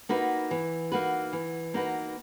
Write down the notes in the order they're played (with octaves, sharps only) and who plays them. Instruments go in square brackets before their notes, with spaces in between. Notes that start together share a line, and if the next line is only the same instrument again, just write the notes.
[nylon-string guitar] A#3 D#4 F#4 B4
E3
A#3 D#4 F#4 B4
E3
A#3 D#4 F#4 B4